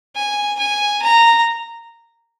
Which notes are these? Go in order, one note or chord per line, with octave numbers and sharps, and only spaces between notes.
G#5
G#5
A#5